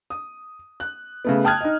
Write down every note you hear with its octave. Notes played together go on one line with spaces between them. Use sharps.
D#6
F#6
C#3 A3 B3
G5 A5 D#6 F6 F#6 G#6
D#4 D#5